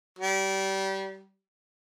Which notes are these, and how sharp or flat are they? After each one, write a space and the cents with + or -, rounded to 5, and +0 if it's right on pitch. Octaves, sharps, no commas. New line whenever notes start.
G3 -25